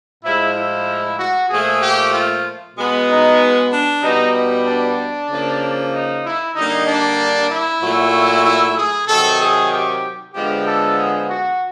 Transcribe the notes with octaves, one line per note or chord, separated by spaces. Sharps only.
A2 F3 G#3 E4
E4
F#4
A#2 F3 A3 G#4
G4
F4
B2 G#3 B3
D#4
D4
B2 G3 B3 D#4
D#4
D4
C#3 F3 A#3
D#4
E4
D3 G3 A#3 D#4
D4
E4
A#2 F#3 A3
E4
G#4
C3 D#3 F#3 A4
G#4
G4
D3 F3 G#3 B3 G4
A4
G#4
F#4